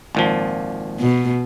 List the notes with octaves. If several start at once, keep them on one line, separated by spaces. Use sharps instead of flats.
G#1 A#2 F3
B2